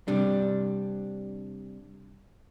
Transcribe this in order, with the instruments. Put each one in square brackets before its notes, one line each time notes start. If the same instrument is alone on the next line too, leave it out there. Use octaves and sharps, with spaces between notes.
[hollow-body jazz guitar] C3 G3 D4